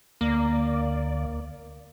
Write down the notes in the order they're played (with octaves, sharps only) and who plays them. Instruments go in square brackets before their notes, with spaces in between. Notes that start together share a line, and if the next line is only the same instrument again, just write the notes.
[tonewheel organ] D2 D5 [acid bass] A#3